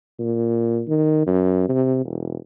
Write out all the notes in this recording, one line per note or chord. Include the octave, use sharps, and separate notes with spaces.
A#2
D#3
F#2
C3
E1